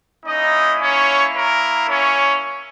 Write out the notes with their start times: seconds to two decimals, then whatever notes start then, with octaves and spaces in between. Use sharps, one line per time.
0.24 A#3 C#4 D#4 E4 D#5
0.80 C#4 C#5
1.34 A#4
1.88 C#4 C#5